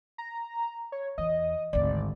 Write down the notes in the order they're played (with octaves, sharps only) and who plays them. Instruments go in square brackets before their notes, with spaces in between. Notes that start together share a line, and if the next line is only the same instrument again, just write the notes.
[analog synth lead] A#5
C#5
[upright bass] E2 [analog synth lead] D#5
[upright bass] G#1 D2 [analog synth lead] D5